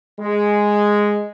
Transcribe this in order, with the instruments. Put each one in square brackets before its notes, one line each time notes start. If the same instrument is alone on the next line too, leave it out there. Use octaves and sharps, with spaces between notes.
[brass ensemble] G#3